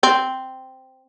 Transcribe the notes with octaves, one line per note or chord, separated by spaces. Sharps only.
C4